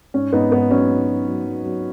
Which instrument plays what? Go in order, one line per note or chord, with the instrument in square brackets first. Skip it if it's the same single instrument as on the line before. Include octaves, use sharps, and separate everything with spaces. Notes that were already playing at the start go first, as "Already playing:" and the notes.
[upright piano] G#2 C#4
G#2 B3 D#4
G#2 B3
F#3 C#4
F#3
F#3
F#3
F#3
F#3